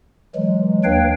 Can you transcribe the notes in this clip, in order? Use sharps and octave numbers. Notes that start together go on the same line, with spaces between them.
E3 F#3 G#3
D#2 D4 B4 C#5 F5 G5